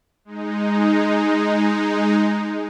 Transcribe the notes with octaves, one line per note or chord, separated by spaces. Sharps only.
G#3 D#4